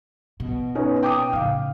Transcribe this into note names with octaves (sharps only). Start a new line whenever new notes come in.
B2
B3 C#4 D#4
G5 D6 D#6
A2 C#3 F5